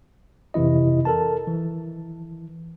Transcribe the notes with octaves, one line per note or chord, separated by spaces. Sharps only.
F2 C3 E3 E4 D#5
A4 A#4 A5
E3